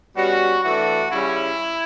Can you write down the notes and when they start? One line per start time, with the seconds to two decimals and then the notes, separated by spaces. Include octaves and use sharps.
0.16 B2 G3 C#4 F#4
0.64 E3 A3 D4 F#4
1.12 C#3 G3 C#4 E4